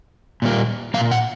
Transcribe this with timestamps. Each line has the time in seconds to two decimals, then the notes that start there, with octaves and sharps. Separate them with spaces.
0.42 A#2 G3 A#3
0.94 A#2 G3 A#3 F5
1.11 F#5